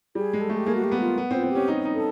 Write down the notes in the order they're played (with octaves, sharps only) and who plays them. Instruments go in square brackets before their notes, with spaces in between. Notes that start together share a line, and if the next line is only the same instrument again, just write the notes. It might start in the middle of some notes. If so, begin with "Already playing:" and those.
[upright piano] G3 [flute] G#4
[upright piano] G#3
[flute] A4
[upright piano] A3
[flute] G4
[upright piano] A#3 [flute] G#4
[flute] F#4
G4
[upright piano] B3
[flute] F4
[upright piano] B3
C4
[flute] F4
[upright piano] C4
[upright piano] C#4 [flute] G4
[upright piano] D#4
D#4
[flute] A4